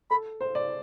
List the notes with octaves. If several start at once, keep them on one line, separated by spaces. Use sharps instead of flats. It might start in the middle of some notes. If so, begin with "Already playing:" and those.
A4 B5
C5
D5